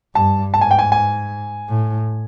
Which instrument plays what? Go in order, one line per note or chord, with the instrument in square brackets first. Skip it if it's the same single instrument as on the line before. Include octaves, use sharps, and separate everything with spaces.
[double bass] G2 [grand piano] A5
[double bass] G#2 [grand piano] A5
[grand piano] G#5
G5
G#5
G#5
[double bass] A2